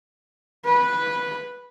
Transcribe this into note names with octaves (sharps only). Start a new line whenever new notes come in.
B4